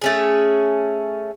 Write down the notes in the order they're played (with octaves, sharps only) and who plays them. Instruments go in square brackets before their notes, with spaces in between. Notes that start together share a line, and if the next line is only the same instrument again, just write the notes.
[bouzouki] A3 C#4 G#4